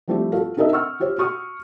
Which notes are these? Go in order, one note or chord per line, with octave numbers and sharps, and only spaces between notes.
F3 G3 A3 C4 E4 G4
F4 F#4 A4 F5
D4 D#4 A4 A#4 D#5 E5
F#5 C#6 E6 F6
F4 G4 C5 C#5
F#4 C#6 D#6 F6